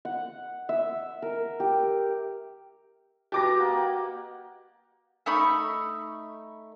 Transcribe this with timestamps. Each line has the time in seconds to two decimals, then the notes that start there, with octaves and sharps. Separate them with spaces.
0.05 F#5
0.69 E5
1.22 A#4
1.60 G4
3.32 F#4 G4 B4 A5 D6 A#6
3.59 A#3 D#5 F#5
5.26 A3 D#4 B5 C#6